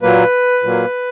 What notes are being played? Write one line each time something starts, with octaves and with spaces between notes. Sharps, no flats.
A#2 F#3 A#3 B4
A#2 F#3 A#3